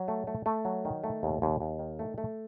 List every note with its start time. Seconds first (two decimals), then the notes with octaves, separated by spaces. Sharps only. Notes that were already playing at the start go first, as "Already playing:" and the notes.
Already playing: F#3
0.08 A3
0.27 A3
0.46 A3
0.65 F#3
0.85 D#3
1.04 A3
1.23 D#2
1.42 D#2
1.60 D#2
1.79 D#3
1.99 A3
2.18 A3